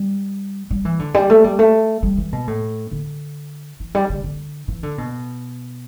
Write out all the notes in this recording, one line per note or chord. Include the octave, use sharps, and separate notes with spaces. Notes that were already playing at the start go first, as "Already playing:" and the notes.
Already playing: G3
G3
E3
D3
G3
A3
G3
A3
G3
E3
B2
A2
D3
E3
G3
D3
D3
E3
D3
B2